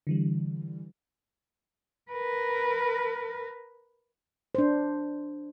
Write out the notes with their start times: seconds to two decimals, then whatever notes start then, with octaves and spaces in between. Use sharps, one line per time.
0.07 D3 E3 G3
2.12 A#4 B4
4.55 D4 C5